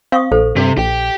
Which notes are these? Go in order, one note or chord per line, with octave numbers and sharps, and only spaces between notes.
C4 F5 C#6 D#6
A#1 A4 C5
G2 C3
A#1 G4 G5